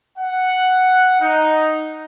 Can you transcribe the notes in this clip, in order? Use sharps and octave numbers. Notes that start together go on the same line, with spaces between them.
F#5
D#4